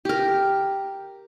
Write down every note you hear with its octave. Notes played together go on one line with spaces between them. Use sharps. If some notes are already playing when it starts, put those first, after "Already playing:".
G4 A#4